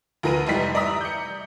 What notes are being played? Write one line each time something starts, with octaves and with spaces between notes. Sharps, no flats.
D2 F3 A#4 B4 D#7
F1 G#2 E3 G3 B6
D5 E5 A#5 D#6
G6 C#7